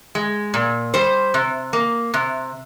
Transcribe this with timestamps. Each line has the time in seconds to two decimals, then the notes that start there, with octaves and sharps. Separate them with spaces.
0.15 G#3
0.54 A#2
0.94 G3 C5
1.34 C3
1.73 A#3
2.14 C3